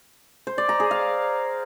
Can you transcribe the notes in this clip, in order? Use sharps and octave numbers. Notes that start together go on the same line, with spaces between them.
C5
D5
A#5
G#4
F5